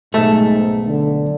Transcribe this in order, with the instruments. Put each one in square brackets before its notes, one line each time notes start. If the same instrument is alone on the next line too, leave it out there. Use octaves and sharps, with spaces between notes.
[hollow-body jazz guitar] B1 A3 [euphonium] G#2
[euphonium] D3